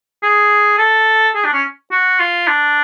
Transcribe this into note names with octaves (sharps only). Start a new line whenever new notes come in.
G#4
A4
G#4
D4
C#4
F#4
F4
D4